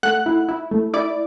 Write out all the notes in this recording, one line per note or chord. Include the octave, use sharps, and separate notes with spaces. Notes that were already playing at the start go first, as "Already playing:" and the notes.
A3 F#5 F#6
E4
E4
A3
E4 D5 D6